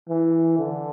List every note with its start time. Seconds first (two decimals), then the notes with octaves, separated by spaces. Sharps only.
0.09 E3
0.58 D3